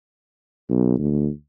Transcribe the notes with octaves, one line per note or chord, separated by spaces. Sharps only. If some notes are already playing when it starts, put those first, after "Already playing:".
B1
D2